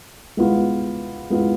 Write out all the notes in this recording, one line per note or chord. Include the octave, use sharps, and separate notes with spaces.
G#3 B3 F4
G#3 B3 F4